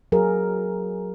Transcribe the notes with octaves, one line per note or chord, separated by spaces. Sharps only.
F#3 G#4 A#4